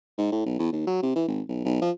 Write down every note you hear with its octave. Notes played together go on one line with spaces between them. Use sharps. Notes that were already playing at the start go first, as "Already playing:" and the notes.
G#2
A2
B1
E2
D#2
F#3
C3
E3
G#1
B1
B1
F3